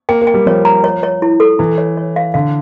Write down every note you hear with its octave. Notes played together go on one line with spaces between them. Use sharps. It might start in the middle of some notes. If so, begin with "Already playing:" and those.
A#3 G5
A#3
G5
G3
F3 C#5
A#5
C#5
C#5
E4
A4
E3 E4
C#5
C#5
F5
D3 F5